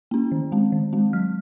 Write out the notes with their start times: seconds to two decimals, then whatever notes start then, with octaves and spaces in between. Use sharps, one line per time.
0.11 A#3 C#4
0.32 D#3
0.52 G#3 C4
0.72 D#3
0.93 G#3 C4
1.13 F#3 F6